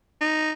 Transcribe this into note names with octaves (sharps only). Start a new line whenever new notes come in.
D#4